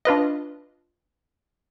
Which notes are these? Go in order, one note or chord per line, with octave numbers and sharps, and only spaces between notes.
D4 F4 B4 D#5